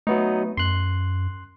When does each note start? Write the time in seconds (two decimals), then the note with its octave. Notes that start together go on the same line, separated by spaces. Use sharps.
0.07 F#3 A3 B3 D#4
0.57 F#2 C6 F#6